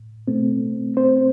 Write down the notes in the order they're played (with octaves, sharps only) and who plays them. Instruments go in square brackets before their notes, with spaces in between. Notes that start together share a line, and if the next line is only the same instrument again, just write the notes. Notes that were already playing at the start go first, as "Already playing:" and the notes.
Already playing: [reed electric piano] A2
B2 A3 C4
C4 C5